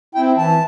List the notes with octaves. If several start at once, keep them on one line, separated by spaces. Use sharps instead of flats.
C4 E4 G5
E3 A5